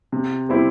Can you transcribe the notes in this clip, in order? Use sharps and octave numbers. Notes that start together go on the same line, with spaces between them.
C3
G3 C4 E4 G4